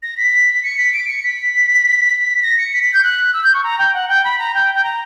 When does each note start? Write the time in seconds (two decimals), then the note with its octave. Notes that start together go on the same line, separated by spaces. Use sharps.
0.03 A#6
0.17 B6
0.63 C#7
0.78 B6
0.93 D7
1.08 C#7
1.23 B6
2.43 A#6
2.58 C#7
2.73 B6
2.83 B6
2.94 G6
3.03 F#6
3.34 E6
3.44 G6
3.54 C#6
3.64 A#5
3.79 G5
3.94 F#5
4.09 G5
4.24 B5
4.39 A#5
4.54 G5
4.75 G5
4.84 A#5